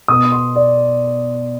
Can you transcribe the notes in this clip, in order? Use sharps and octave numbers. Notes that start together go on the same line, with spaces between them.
B2 B3 D#6
C6
D5